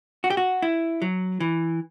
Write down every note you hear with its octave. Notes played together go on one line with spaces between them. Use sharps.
F#4
G4
F#4
E4
F#3
E3